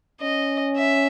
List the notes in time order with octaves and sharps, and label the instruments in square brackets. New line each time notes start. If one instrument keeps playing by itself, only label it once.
[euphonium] C#4 [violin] D#5
[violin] E5